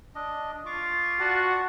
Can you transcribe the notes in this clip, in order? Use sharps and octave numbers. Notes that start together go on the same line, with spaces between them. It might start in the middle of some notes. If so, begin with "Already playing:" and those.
D4 D#5
F4 C#6 D6
F#4 D5 F#5 A5